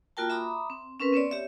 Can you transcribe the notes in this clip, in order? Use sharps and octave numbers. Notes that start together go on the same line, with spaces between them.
A#3 F4 F#4 A#4 G5 A5
E5 A#5 B5 D6 D#6
C4
C4 C#4 A#4 B4
B3 C4 C#5 D5
G4 C#5 E5